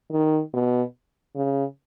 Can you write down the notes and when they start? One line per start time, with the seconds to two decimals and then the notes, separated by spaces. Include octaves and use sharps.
0.12 D#3
0.54 B2
1.35 C#3